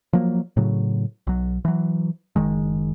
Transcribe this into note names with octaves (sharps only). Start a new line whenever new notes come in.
F3 F#3 A#3
A2 C#3 F#3
B1 F#3
E3 F#3
F#1 D#3 G#3